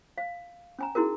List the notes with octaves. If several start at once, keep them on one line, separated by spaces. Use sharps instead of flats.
F5
C#4 G#5 A#5
D#4 E4 F#4 G#4 A#4